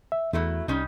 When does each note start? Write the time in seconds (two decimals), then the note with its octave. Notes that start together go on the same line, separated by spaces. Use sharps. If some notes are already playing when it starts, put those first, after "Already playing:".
0.12 E5
0.33 E2 F#3 A3 E4
0.68 C2 G3 C#4 D#4